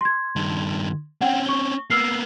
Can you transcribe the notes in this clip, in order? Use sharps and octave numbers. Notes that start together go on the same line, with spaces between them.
C6 G#6
G2 D#3
C4 C#4 F#5 G5
C#6 G7
A#3 B3 E6 F6 C7